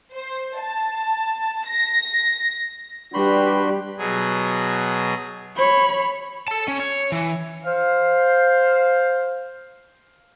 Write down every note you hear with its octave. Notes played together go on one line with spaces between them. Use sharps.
C5
A5
A#6
G3 D4 F#4 G4 B4 B5 C6
B2 F#3 G#4
C#5 B5
A4 A5
C#4
C#5
E3
C5 F5